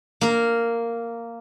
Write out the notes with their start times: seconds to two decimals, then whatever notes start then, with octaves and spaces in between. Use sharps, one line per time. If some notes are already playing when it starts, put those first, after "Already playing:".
0.21 A#3 A#4